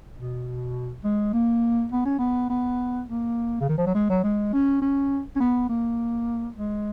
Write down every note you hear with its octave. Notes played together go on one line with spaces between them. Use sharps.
B2
G#3
A#3
B3
C#4
B3
B3
A#3
C#3
D#3
F3
F#3
G#3
F#3
G#3
C#4
C#4
C#4
B3
A#3
G#3